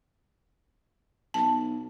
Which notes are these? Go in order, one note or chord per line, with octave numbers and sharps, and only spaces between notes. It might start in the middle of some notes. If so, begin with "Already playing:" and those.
B1 A5